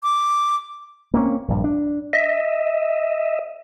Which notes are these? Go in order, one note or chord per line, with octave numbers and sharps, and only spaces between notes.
D6
A#3 C4 C#4
A#1 G2
D4
D#5 E5